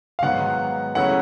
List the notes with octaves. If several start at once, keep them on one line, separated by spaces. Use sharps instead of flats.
F5
G#2 D#3 F#3 B3 F#5
C#3 F#3 A3 C#4 E4 F#5